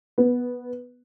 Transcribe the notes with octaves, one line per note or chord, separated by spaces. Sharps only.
B3